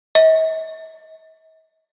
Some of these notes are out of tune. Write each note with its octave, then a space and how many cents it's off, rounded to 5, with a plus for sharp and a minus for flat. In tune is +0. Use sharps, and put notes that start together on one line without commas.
D#5 +45